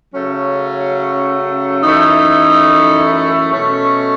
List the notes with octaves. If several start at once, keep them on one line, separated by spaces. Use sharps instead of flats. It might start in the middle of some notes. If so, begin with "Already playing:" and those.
C#3 F#3 A3 C#4
F#2 E3 A3 D#4
B2 A3 C#4